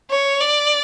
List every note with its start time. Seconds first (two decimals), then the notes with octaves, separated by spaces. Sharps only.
0.11 C#5
0.41 D5